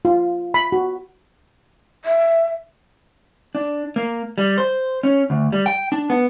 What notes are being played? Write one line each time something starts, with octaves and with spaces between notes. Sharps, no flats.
F4
B5
F#4
E5
D4
A#3
G3
C5
C#4
D2
G3
G5
D4
B3